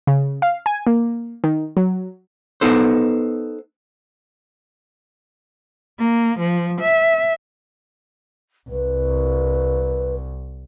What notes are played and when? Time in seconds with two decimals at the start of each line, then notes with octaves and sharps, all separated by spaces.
0.07 C#3
0.42 F5
0.66 G#5
0.87 A#3
1.44 D#3
1.77 F#3
2.61 B3 D#4 A4 C5
5.99 A#3
6.40 F3
6.81 E5
8.70 C2 B4